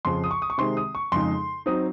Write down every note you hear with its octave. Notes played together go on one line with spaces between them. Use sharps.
F2 C#3 F3 C6
D#6
C#6
D#6
C#6
C3 D#3 G#3 C4 C6
D#6
C#6
F2 C#3 G#3 D#4 C6
F#3 C4 D#4 D#6